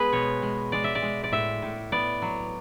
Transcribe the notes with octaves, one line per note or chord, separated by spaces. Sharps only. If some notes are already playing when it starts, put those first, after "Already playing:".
Already playing: G#3 B3 G#4 B4
B2 C#5
G#3
G#3 D5
E5
D5
G#3
D5
A2 E5
A2
B3 D5
F#3